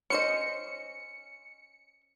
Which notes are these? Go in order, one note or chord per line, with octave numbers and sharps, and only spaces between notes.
C#4 C5 D#5 C#7